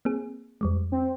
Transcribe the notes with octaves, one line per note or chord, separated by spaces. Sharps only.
A#3 C4 G#4
F2 G3 G#3
C4